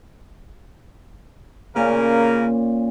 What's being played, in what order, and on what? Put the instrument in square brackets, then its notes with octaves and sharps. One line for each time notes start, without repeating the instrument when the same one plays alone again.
[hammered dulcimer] A#2 C#4 [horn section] C#3 A#3 A#4